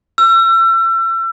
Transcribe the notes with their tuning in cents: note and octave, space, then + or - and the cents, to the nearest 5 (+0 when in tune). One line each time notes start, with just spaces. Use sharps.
E6 +35